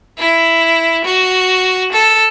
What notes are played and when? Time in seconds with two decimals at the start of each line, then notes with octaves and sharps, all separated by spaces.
0.18 E4
1.04 F#4
1.92 A4